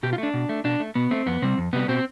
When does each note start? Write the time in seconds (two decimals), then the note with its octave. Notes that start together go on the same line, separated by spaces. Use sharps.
0.03 B2 G4
0.13 F4
0.18 A3 D4
0.34 B2
0.49 A3
0.64 B2 D4
0.80 A3
0.95 B2 B3
1.11 A3 C4
1.26 F2 B3
1.42 C3 G3 C4
1.58 F2
1.73 C3 G3 B3
1.88 B2 C4